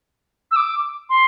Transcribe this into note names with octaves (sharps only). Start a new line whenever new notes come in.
E6
D6
C6